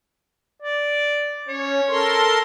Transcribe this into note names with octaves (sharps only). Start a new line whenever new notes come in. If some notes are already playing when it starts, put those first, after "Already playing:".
D5
C#4 C#5
A4 A#4 C6